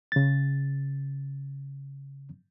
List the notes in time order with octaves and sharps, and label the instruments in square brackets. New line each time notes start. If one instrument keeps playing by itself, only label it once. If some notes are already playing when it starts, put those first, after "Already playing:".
[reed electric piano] C#3 A6